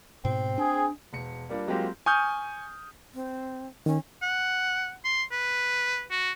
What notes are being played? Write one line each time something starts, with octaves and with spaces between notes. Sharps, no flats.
G#2 B2 C4
D4 G#4
E1 C#7
G3 A#3 D4 F4
F#3 G#3 A#3 C4 F4 G4
G#5 C#6 D#6 F6 G6
C4
D#3 C#4
F#5
C6
B4
F#4